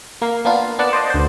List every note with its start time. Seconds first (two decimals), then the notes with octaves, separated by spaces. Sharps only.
0.22 A#3 F5
0.45 A#3 B3 D4 F4
0.79 B3 D4 D5 F#5 A5
0.93 C5 D5 D#5 A5
1.10 D2 C5